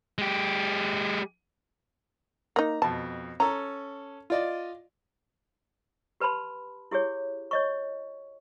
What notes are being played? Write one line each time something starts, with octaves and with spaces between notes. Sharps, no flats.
G#3 G4
A#3 D#4 A#5
F2 B2 A5
C#4 A4 A#5
F4 D5 D#5
G4 B4 A5 B5 C6
E4 G4 G#4 C#5
C#5 D#5 C#6